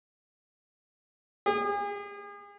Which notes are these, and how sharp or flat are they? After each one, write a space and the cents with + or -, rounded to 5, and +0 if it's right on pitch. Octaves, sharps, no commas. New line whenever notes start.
G#4 -40